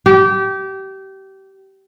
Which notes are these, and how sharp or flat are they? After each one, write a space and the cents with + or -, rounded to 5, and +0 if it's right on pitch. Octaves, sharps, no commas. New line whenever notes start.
G4 -25